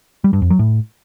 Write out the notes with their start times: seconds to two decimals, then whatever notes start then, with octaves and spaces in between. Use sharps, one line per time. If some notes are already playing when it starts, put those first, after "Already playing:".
0.24 G3
0.33 G2
0.42 F2
0.50 F#3
0.59 A2